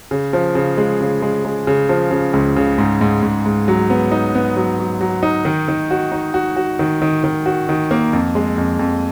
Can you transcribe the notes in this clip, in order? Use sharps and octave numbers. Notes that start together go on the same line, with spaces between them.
C#3
F3
C#3
G#3
C#3
G#3
G#3
C#3
F3
C#3
C#2
C#3
G#2
G#2
G#2
G#2
F#3
B3
D#4
B3
F#3
F#3
F#3
D#4
D#3
D#3
F#4
D#4
F#4
F#4
D#3
D#3
D#3
F#4
D#3
A#3
F2
G#3
F2
F2